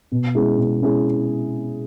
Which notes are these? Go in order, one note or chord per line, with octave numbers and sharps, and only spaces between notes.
B2
G#3 C#4 E4 G#4
B2
G#3 C#4 E4 G#4